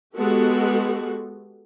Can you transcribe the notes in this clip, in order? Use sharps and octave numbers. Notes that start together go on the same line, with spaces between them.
G#3 B3 F#4 G4 A4